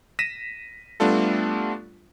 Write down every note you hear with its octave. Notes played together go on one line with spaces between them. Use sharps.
A#6 B6 D#7 E7
G3 A3 B3 D4 F4 A4